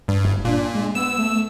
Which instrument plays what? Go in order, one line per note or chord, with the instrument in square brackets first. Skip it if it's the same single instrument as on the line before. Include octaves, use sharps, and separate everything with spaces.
[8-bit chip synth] G2
[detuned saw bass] F#1
[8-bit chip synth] A#2 [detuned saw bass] D4
[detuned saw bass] G#3
[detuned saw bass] B3 [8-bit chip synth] E6
[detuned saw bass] A3